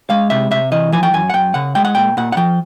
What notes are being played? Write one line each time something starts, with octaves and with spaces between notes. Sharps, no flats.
G#3 F5
C3 E5
C3 E5
E3 D#5
F3 G#5
G5
F#2 G#5
F#5
F#2 G5
C#3 F#5
G#3 G5
F#5
A#2 G5
A#2 F#5
F#5
F3 G5